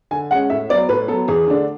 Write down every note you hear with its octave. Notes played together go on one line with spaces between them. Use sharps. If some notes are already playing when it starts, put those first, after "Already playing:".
D3 G#5
G#3 C#4 F#5
A2 E5
F#3 B3 D5
A2 B4
F#3 B3 A4
E2 G#4
D3 A3 D4